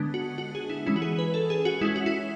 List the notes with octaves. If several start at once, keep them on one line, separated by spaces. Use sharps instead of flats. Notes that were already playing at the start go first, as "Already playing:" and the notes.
Already playing: D3 G#3 B3 D4
F#4
F#4
G#4
E4
E3 G#3 C#4 E4
F#4
G#4
B4
A4
G#4
F#4
G#3 C#4 E4
F#4
E4